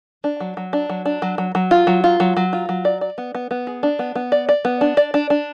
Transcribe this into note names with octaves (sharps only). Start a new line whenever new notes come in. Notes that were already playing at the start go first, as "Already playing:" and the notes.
D4
F#3
F#3
D4
F#3
D4
F#3
F#3
F#3
F4
F#3
F4
F#3
F#3
F4
F#3
D5
D5
B3
B3
B3
G#4
D4
B3
B3
D5
D5
B3
D4
D5
D4
D4